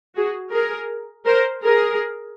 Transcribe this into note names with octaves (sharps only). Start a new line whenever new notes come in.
F#4 G#4
G#4 A#4
A#4 C5
G#4 A#4